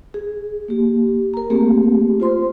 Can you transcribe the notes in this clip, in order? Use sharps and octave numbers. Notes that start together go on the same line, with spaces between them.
G#4
A#3 G4
A#4 A#5
A3 A#3 C4 G4 G#4
F4 C5 C6